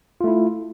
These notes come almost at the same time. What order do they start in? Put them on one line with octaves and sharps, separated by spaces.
F4 A3 E4